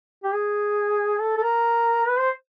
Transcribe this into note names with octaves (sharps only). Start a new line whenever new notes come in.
G4
G#4
A4
A4
A#4
B4
C5